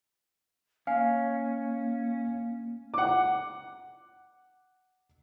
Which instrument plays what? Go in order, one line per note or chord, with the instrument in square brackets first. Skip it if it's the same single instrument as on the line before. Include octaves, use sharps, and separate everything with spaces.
[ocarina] A#3 [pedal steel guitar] C#4 [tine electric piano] F5 [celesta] G#5
[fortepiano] F#5 D6